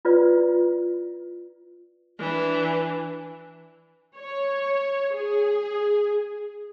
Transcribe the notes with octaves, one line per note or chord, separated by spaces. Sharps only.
E4 F4 B4 D5
E3 D4
C#5
G#4